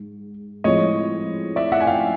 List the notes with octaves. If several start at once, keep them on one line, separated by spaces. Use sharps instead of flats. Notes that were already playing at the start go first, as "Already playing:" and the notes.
Already playing: G#2
A2 F3 G#3 C4 C#5 D#5
D5 E5
E5 F#5
G#5
F5 G5